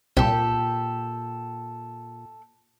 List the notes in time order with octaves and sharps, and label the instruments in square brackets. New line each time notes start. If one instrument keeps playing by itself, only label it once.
[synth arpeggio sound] C2 [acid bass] A#2 [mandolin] G4 A4